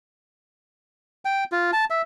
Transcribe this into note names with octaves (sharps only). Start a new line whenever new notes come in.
G5
F4
A5
E5